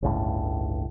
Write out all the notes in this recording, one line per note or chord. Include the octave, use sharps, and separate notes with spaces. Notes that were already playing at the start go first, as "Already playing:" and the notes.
G1 C#2 A2